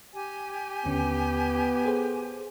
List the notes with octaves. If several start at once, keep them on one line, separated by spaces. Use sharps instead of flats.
G4 G#5
D#2 D3 B3 C#4
G#4 A4 C5